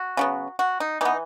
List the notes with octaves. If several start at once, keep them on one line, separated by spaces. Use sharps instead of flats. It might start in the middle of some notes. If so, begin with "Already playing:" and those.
Already playing: F#4
C#3 F#3 B3
F#4
D#4
E3 B3 D#4